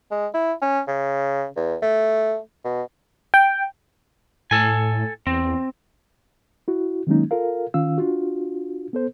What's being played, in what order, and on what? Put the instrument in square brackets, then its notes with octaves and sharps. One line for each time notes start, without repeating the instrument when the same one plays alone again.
[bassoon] G#3
E4
C#4
C#3
E2
A3
B2
[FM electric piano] G5
[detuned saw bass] A2 [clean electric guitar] A4 G#5
[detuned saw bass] E2 [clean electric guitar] C4
[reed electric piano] E4 F#4
D#3 F#3 G#3 A#3 C#4 D#4
F4 A4 A#4 F5
D#3 C#4 F4 F5 E6
D4 F4 F#4
B3 A4 C5